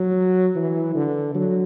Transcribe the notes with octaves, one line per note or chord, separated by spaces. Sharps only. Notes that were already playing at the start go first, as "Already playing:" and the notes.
Already playing: F#3
E3
D3
F#3